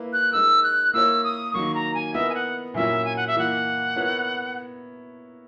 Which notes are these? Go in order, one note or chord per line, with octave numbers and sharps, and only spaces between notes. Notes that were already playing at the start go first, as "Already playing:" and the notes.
Already playing: A#3 E4 B4
F#6
G#3 D#4 A#4 E6
F#6
A#3 E4 A#4 C#5 E6
D#6
D#3 F#3 A#3 C#6
A#5
G#5
B3 E4 A#4 D#5 E5
G#5
F#5
A#2 F#3 C#4 E4 A#4 E5
G#5
F#5
E5
E3 A#3 E4 F#5
B3 E4 A#4 C#5